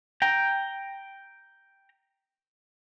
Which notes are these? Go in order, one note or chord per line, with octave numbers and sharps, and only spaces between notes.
G5 A#5